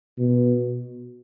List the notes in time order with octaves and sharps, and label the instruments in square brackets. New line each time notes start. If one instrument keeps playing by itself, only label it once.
[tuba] B2